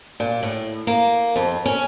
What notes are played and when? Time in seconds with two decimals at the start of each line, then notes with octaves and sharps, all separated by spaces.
0.20 A#2
0.43 A2
0.87 A#3
1.36 F2
1.66 C#4